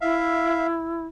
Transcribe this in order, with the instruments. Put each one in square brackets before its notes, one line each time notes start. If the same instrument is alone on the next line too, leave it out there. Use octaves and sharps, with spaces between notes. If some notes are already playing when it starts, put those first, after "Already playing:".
[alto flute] E4 [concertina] E5 F5